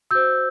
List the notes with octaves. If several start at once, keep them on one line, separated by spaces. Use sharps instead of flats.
F#4 C5 E6 G6